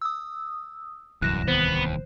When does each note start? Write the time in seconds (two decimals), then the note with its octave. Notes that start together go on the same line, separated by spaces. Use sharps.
0.01 D#6 E6
1.22 D1 C2 F#2 E3 F#6 A#6 E7
1.48 D#2 B3 C5